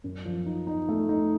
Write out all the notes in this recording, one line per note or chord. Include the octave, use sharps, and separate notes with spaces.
F#2
F3
D#4
D#4
A3
D#4